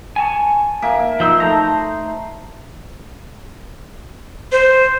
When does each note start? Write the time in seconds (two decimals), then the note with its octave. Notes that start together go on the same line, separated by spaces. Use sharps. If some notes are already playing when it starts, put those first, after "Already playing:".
0.16 G#5 A5 C#6
0.82 A#3 E5 D6
1.20 F3 D#4 C6 E6
1.40 A3 C5 A#5
4.52 C5